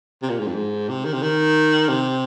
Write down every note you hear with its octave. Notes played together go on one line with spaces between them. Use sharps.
C3
A#2
G#2
F2
G#2
C3
D#3
C3
D#3
C3